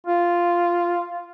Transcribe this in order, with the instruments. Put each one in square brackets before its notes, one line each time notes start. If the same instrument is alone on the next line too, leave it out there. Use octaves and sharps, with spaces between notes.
[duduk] F4